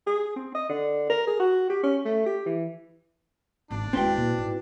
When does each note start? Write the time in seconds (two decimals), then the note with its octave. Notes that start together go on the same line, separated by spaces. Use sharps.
0.07 G#4
0.36 C4
0.55 D#5
0.69 D3
1.10 A#4
1.27 G#4
1.40 F#4
1.70 G4
1.83 C#4
2.05 A3
2.26 G4
2.46 E3
3.71 G#1 D4 D#4
3.93 D#2 G#3 C4 E4 F#4 B4 G5
4.16 A#2
4.38 G#2